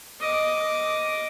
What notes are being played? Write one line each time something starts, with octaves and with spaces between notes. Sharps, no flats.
D#5 D6